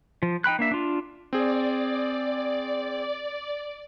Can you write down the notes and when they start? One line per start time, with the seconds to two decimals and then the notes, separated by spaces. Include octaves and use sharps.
0.23 F3
0.44 D#4 G5 B5 F#6
0.59 A#3 D4 E5
0.71 D4 F4
1.33 C4 G#4 D5